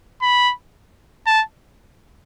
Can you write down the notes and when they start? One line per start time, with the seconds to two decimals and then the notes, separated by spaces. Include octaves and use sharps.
0.22 B5
1.27 A5